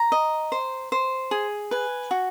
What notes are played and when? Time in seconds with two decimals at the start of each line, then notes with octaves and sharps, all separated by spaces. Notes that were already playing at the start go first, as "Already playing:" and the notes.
Already playing: A#5
0.12 D#5
0.52 C5
0.92 C5
1.31 G#4
1.71 B4 G#5
2.11 F#4